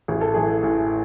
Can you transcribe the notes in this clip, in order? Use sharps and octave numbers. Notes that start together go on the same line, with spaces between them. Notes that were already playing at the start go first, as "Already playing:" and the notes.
A1 G#4
A4
A2 E3 A3 G#4
A1